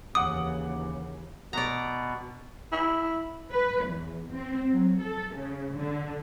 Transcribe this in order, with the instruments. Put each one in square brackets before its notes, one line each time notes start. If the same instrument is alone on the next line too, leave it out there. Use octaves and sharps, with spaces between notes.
[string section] D#2 C#3 E3 [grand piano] F5 F#5 D6 [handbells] D#6
[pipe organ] B2 B3 [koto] D5 A#5
[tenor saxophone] E4
[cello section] B4
E2
C4
F#3
A4
C#3
D3